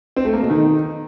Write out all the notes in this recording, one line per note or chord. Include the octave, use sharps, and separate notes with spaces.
C4
A3
A#3
B2
D#3